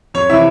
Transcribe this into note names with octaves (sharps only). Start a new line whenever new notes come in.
F2 C#5
C3 E3 E4 E5